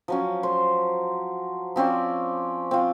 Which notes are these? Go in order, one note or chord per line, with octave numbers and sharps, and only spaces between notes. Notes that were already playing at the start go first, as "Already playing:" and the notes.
F3 F#3 C#4
C5
F3 C4 C#4 D5
C4 F4